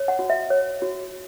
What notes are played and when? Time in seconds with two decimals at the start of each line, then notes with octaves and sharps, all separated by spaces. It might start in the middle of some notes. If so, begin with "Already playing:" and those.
Already playing: C#5
0.08 F#5
0.19 F#4
0.30 E5
0.50 C#5
0.82 F#4